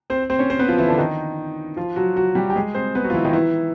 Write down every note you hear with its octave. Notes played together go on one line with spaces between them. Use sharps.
C4 C5
C4 C5
C#4 C#5
C4 C5
B3 B4
F3 F4
E3 E4
D3 D4
D#3 D#4
F3 F4
F#3 F#4
F#3 F#4
G3 G4
G4
G#3 G#4
C4 C5
B3 B4
F#3 F#4
F4
E3 E4
D#3 D#4
E3 E4